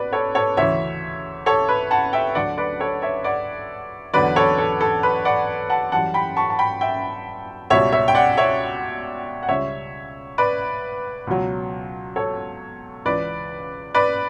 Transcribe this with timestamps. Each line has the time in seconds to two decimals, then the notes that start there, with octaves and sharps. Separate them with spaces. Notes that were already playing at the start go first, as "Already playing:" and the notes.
Already playing: B2 B4 D5
0.13 A4 C#5
0.35 A4 C#5
0.57 D2 C#3 E3 C#5 E5
1.46 A4 C#5
1.69 B4
1.91 F#5 A5
2.13 E5 G5
2.35 D2 D3 F#3 D5 F#5
2.58 B4 D5
2.80 A4 C#5
3.02 C#5 E5
3.24 D5 F#5
4.14 E2 D3 F#3 B4 D5
4.36 A4 C#5
4.58 A4
4.81 A4
5.03 B4
5.25 D5 F#5
5.70 F#5 A5
5.92 F#2 E3 G3 F#5 A5
6.14 G5 B5
6.37 A5 C#6
6.50 A5
6.59 G5 B5
6.81 E5 G5
7.70 C#2 B2 G3 C#5 E5
7.92 C#5 E5
8.08 G5
8.15 D5 F#5
8.37 C#5 E5
9.43 F#5
9.48 C#2 C#3 G3 C#5 E5
10.38 B4 D5
11.27 C#2 B2 F#3
12.16 A4 C#5
13.05 C#2 C#3 E3 B4 D5
13.94 B4 D5